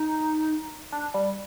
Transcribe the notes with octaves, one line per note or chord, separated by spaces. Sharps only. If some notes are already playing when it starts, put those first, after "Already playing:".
Already playing: D#4
D4
G3